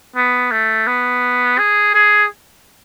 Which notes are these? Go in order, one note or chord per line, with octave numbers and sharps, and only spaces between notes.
B3
A3
B3
G#4
G#4